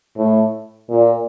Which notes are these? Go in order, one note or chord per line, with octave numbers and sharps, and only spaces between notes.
A2
A#2